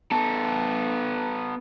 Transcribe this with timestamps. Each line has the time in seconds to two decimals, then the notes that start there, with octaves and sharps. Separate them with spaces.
0.12 B3 A4